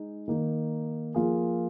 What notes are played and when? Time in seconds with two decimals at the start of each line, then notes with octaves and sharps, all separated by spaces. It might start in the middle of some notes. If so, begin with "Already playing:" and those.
Already playing: G#3 D#4
0.28 D#3 A#3 D#4
1.14 F3 A#3 F4 G#4